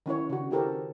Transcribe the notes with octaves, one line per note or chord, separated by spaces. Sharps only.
D#3 C#4 E4 C#5
C#3 D4 F#4
D#3 E4 G4 A4 A#4 C5